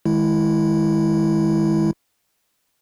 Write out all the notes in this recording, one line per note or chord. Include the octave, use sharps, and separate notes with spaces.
D#3 G#3 E4